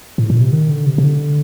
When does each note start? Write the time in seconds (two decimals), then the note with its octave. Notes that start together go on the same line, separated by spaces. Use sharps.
0.18 A2
0.30 A#2
0.41 C3
0.53 D#3
0.70 D3
0.86 C3
0.98 C3
1.04 D3